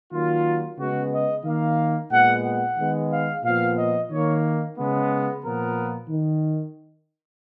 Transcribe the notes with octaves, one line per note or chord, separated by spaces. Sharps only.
D#3 F#3 A#3 F4
C#3 G#3 B3 F#4
D#5
D#3 A#3 F5
A#2 G#3 B3 F#5
F#5
D#3 G#3 B3
F5
A#2 F3 B3 F5
D#5
D#3 A#3 C#5
C#3 G#3 B3
A#2 F3 B3 A#4
D#3